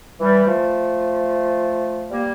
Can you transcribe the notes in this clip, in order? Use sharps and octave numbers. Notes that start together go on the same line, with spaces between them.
E3 G3
F3 A3
G3 A#3